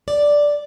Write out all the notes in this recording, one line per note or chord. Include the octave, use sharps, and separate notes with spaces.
D5